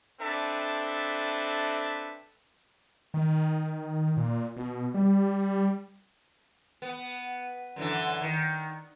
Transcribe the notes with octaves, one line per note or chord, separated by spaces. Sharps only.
C4 D4 A4 B4 E5 A5
D#3
A#2
B2
G3
B3
F#2 D3 E3
D#3